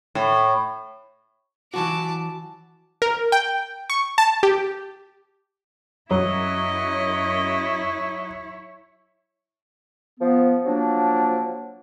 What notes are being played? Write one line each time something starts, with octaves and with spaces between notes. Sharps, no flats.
A2
E3 F#3 F#4 A5 D6
A#4
G5
C#6
A5
G4
F#2 F#3 E4 C#5 D#5
F3 B3
F3 F#3 A#3 D4